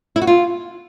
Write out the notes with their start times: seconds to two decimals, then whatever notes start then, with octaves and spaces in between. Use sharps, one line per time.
0.16 E4
0.22 F#4
0.27 F4